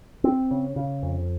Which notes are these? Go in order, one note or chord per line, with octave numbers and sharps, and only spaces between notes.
C4
C#3
C#3
F2